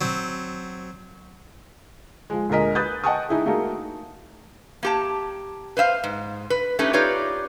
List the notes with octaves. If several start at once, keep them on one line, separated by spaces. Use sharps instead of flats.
F#3 C4
F3 G#3
D2 A#2 G#3 A#4 D#5 B6
B4 B5 D#6 F#6 G6 A6
D#5 F#5 G5 A5 C#6 D#6
D#4 E4 G#4
A3 A#3 D#4 F#4 G#4 A#4
A#3 G4 A5
B4 C5 E5 F5
G#2
B4
A3 C#4 D#4 G4 B4
D#4 F4 G4 B4 C#5 D5